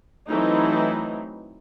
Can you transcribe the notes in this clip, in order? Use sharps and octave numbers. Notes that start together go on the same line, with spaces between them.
E3 F#3 A3 C4 D#4 E4